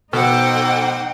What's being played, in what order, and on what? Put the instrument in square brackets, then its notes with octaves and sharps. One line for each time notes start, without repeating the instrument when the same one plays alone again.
[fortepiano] B2 [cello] D#4 G5 [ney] A4 [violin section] C5 F#5 D6